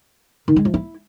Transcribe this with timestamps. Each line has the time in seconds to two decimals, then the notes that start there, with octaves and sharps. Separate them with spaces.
0.48 D#3
0.56 G#3
0.65 F3
0.74 E4